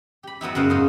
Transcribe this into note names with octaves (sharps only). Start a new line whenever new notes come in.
G4 B5
F#3 B3 D#4 E4
F#2 C#3 B3 F#4 B4 F5
G#2 C#4 D#4